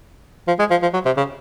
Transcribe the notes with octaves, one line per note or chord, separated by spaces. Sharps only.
F3
G#3
F3
F3
F#3
C3
C#3